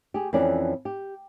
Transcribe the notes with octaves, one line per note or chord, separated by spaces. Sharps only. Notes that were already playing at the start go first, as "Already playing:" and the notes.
G4 G#4
F2 E3 C#4 D5
G4